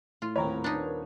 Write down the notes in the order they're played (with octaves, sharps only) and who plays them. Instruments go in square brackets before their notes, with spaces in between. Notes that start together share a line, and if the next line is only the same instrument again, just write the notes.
[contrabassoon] A2 [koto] F4
[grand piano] D#1 C#5 [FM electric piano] C4 A#4 B4
[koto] D4 D#4